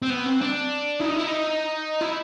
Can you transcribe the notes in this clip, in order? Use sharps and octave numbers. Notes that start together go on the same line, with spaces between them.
C4
B3
C4
D4
E4
D#4
E4
D#4
E4